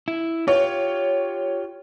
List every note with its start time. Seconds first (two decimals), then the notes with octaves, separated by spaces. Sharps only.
0.08 E4
0.48 F4 G4 C#5